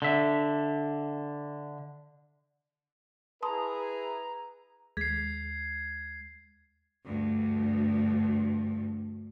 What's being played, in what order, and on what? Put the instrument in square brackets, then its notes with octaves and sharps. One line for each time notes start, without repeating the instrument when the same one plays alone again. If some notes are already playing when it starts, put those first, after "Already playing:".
[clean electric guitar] D3 E5
[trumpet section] E4 G#4 [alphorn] B4 [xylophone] A5 C6 D#6 [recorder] A#5
[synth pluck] D#2 G#3 B6 [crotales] G#6 C7
[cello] D2 G2